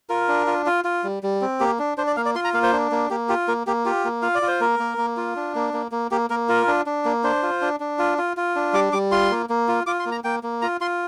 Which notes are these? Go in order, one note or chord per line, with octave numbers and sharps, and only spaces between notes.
F4 A#4
D4
F4
F4
F4
G3
G3
C4
A#3 G4
D4
D4 C5
D5
A#3 F5
D5
F4 C6
A#5
A#3 F5
C5
D4
A#3
A#3 G4
F4 G4
A#3 A#4
A#3 G4
F4 G4
A#3
F4 F5
D5
F4
C5
A#3 A#4
A#3
A#3
F4
D4
A#3
A#3
A#3
A#3 G4
A#3 A#4
F4 A#4
D4
D4
A#3
D4 C5
F4
D4
D4
F4
F4
F4
D4
G3 D6
G3 D6
F4 C6
A#3
A#3
F4
F4 D6
C6
A#3
A#5
A#3 G5
A#3
F4 A#5
F4 C6